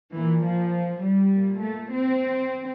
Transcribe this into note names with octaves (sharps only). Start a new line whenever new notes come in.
A#2 E3
F3
G3
A#2
A3
C4